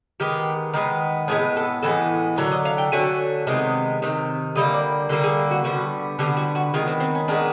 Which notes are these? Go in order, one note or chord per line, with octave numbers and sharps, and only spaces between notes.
D#3 G#3 B3 G4
D#3 G#3 B3
A2 E3 G#3 B3 G#4
A4
A2 E3 G#3 B3 A4
D3 F#3 A3 A#4
D#5
F5
G5
D3 F#3 A3 G#5
C3 D#3 G#3 B3
C3 D#3
D3 G3 A#3 D#5
D5
D3 G3 A#3 A4
G#4
F#4
D3 G3 B3 F#4
D3 G3 B3 G4
F#4
F#4
D#3 G#3 B3 F4
C4
C4
C#4
D#3 G#3 B3 D4